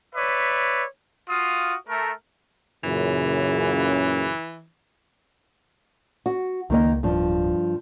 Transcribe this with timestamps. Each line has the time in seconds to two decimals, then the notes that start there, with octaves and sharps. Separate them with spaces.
0.15 B4 C#5 D5 E5
1.29 F4 F#4 F5 D#6
1.89 A3 A#4
2.84 F#2 A#2 C#3 E3
6.26 F#4
6.70 C#2 D#3 A#3 D#5
7.03 D1 G2 F3